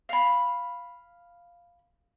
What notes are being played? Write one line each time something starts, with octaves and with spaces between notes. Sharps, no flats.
F5 B5